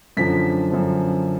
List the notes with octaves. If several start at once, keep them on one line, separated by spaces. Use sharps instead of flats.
F#2 D3 F3 B6
F#2 D3 F3